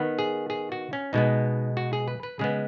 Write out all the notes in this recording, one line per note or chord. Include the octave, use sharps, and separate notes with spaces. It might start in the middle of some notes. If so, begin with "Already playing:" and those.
Already playing: D#3 B3
G#4
G#4
F#4
C#4
B2 G#3 B3 D#4
F#4
G#4
B4
B4
C#3 G#3 B3 G#4